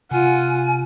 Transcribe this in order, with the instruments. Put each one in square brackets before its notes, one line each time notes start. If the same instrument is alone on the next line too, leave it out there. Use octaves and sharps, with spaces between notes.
[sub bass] C3 [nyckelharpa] F4 F#5 [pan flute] G#5